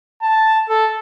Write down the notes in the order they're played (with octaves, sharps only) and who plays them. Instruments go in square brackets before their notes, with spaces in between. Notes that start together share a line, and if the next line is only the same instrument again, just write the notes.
[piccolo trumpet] A5
A4